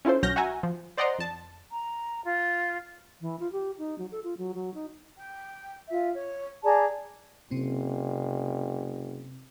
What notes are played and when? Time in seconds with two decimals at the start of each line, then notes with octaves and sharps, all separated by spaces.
0.05 C#4 E4 F4 A4 C5
0.23 B1 F#3 C#4 F6 G6 A#6
0.36 F#4 E5 F#5 G#5 A#5
0.63 F3
0.97 C5 D5 D#5 F#5 A#5 C6
1.19 F2 A5
1.70 A#5
2.25 F4
3.21 E3
3.40 F4
3.52 G4
3.78 D#4
3.99 F#3
4.12 A4
4.24 F4
4.38 F#3
4.55 F#3
4.74 D#4
5.20 G5
5.88 F4 E5
6.14 C#5
6.63 G#4 D5 A5 A#5
7.51 F#1 C3 C4